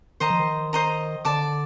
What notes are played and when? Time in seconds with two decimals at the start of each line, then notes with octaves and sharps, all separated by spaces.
0.20 D#3 C5 D#5 A#5
0.30 F3
0.39 D#3
0.73 C5 D#5 A#5
1.25 D3 D5 A5 D6